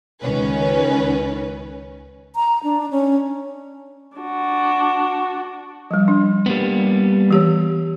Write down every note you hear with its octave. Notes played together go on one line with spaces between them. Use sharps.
C#2 D#3 C#4 B4
A#5
D4
C#4
D4 F#4
F3 G3
D4
G3 A#3 B3
E3 G4 C#5